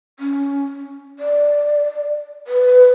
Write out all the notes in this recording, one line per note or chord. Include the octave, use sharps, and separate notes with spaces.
C#4
D5
B4